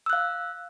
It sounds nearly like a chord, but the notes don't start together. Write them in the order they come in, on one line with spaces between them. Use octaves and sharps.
E6 F#6 F5